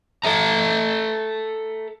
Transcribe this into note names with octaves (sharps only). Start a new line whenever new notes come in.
A4 E5 A#5